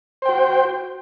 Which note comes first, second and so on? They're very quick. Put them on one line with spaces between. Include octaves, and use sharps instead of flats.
C5 G5 F#4